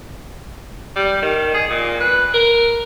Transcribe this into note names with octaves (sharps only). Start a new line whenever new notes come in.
G3
D#3
G#4
A#2
B4
A#4